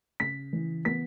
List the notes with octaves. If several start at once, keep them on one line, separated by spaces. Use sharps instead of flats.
C#3 B6
E3
B3 B6